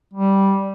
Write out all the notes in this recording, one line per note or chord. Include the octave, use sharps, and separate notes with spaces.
G3